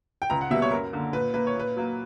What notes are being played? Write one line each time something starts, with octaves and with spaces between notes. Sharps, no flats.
G5
C#2 A#5
F#5
B2 G3 A#3 E5
C#5
F#2 A#4
D3 A#3
A#2 B4
A#3 B4
C#5
A#2 B4
F#3 A#3